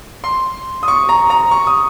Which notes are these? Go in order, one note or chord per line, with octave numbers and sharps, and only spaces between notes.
C6
D#6
C#6
A#5
A#5
C#6
D#6